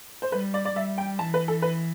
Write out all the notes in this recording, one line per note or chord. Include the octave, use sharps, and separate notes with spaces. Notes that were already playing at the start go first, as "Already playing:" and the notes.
C5
G3 B4
D5
D5
G3 E5
G5
E3 A5
B4
A4
B4